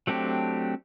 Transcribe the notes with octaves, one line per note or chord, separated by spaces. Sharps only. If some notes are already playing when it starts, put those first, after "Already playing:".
F#3 A3 C4 D4 G4